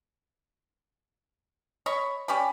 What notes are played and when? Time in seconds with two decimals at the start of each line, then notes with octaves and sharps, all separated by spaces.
1.86 C#5 D#5 B5 C#6
2.28 C#4 G4 D5 B5